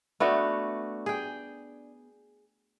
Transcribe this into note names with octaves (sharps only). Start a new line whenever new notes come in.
A3 B3 D4 F#4
G#4 G5